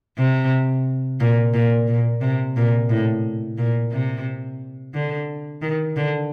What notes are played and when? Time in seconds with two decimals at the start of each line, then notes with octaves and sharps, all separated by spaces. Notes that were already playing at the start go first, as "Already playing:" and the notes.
0.18 C3
1.20 A#2
1.54 A#2
1.87 A#2
2.21 C3
2.56 A#2
2.90 A2
3.58 A#2
3.91 C3
4.94 D3
5.62 D#3
5.96 D3